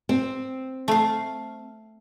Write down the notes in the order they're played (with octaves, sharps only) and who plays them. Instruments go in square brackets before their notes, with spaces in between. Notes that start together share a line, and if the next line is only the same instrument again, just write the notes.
[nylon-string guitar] C4
[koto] A3 F5